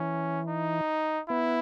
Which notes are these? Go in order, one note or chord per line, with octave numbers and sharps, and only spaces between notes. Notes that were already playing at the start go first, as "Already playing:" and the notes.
Already playing: E3 C#4
D#4
B3 E4